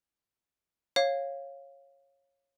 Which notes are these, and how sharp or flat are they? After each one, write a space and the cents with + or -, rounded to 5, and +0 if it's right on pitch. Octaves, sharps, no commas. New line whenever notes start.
C#5 -15 F5 +0